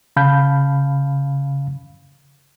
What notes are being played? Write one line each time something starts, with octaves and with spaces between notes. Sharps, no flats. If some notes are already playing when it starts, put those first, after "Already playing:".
C#3 F5 A5 B5 G6